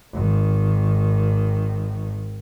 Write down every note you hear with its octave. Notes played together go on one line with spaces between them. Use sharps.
G#1 D#3